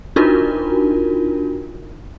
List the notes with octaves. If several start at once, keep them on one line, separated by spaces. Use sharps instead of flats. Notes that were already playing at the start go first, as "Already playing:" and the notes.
D4 D#4 F4 F#4 A#4